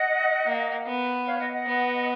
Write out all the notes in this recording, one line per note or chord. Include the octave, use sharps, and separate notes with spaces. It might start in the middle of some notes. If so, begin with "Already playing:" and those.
Already playing: D#5 F#5
A#3
B3
C#5 F5
D#5 F#5
D#5 F#5
B3